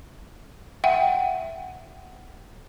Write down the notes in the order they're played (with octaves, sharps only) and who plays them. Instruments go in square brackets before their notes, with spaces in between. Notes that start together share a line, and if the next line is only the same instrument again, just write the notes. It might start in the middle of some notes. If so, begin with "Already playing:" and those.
[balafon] E5 F#5 G5